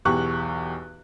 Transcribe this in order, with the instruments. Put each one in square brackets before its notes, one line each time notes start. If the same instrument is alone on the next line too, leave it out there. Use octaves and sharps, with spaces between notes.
[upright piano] B1 E2 G4 C#6 F#6